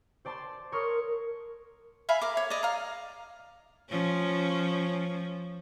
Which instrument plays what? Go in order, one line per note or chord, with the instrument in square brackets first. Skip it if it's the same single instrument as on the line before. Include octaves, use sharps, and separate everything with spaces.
[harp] C5 D5 A5 C6
A#4 C#5 C6 C#6 D#6 F6
[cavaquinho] E5 F5 G#5 B5
A#4 D6
C#5
D5 D#5
F5 A#5
[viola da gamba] F3 C#4